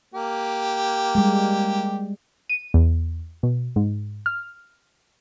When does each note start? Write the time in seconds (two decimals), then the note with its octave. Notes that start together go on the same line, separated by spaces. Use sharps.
0.14 A#3 G4
1.15 G3 G#3
2.50 D#7
2.74 E2
3.43 B2
3.76 G#2
4.26 F6